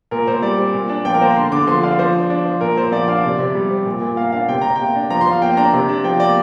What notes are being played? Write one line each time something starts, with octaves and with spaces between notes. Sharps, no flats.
A#2 A#4
A#2 C5
G3 D5
C4
A#2
D4
F3 G5
A#4
A#3 C5
D3 C6
D3 D6
F3 C6
D4 F5
F3 C5
D4
D4
F3
A#2 A#4
A#2 C5
F3 D5
D4 F5
C3 D5
C3
G3
C4
A#2
A#2
A#3 F5
D4 F5
C3 G5
C3 A#5
A#3 G5
D4
F3 A#5
C6
F3 F5
A#3 G5
D4 A#5
C3
D4
F3 G5
A#3 D5